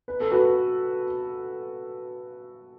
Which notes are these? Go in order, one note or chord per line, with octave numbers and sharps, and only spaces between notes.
B4
A4
F#4 B4